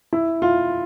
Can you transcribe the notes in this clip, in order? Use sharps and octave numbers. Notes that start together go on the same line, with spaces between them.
E4
F4